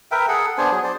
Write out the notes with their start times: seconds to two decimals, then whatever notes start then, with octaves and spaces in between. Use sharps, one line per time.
0.11 A#4 B4 E5 G5
0.28 G#4 A4 F#5
0.58 B3 D4 C5 G#5
0.71 F#3 G#4
0.83 C5 D5